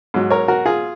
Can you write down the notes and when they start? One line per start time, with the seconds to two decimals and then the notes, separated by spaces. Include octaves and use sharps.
0.14 G#2 F#3
0.30 A#4 C#5
0.48 F#4 A#4
0.66 F4 G#4